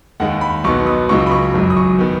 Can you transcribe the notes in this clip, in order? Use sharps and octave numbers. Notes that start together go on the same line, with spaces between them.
D#2 D#3 G#3 F#5
B5
B1 B2 B3 D#4 C#6
D#6
C#2 C#3 F#3 D#4 C#6
B5
C#6
G#1 F#2 F#3
D#6
C#6
D#3 B3